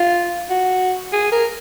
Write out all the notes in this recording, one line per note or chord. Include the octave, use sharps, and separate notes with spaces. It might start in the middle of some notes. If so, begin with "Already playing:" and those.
Already playing: F4
F#4
G#4
A#4